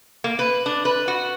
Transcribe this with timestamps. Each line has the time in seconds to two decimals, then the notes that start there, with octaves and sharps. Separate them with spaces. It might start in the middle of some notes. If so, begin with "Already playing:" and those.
0.24 A#3
0.39 B4
0.66 D4
0.85 B4
1.08 F#4